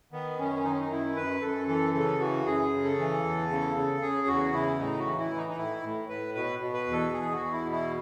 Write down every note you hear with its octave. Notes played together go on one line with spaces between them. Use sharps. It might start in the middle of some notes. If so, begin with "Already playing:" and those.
D#3 B3
F#2 C#4
D#3 D#4
C#4
D#4
F#2 E4
F#2 B4
F#2 A4
E3 A4
C#3 A4
E3 F#4
F#2 G#4
C#3
A4
E3
E2
C#3
C#3
C#3 G#4
E2 F#4
C#3 E4
A2 D#4
F#4
E3
E4
E3
D#4
D#4
A2 E4
A2
A2 B4
B2 B4
B2
B4
E2
A4
E2 G#4
F#4
E2
E4
B2
E4